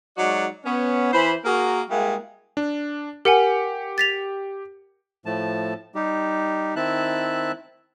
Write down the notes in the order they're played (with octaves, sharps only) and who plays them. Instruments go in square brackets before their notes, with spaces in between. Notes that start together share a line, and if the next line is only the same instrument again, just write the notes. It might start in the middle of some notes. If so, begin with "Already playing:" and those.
[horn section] F#3 G#3 D#4 F#4 D5
B3 C#4
E3 C5 B5
A#3 F#4 G#4 A#4
G3 G#3 A#3 E4 F#4 G#4
[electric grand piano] D4
[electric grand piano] G4 C#7 [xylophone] A#4 F#5 G#5
[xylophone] A6 B6 F7
[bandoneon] A2 F3 A3 A5
G3 D#4 G4
D#3 C4 E4 E5 A5 F#6